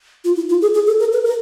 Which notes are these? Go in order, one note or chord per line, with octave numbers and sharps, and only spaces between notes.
F4
E4
F4
G#4
G#4
A4
A#4
B4
A#4